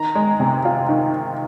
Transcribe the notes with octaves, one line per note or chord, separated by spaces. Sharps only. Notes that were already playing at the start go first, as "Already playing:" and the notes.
Already playing: D#3 A#5
G#3
C3
F4
D#3